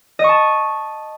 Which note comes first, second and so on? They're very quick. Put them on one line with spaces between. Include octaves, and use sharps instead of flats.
D#5 C#6 A5